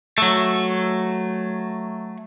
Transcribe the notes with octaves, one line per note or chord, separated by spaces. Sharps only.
F#3 A3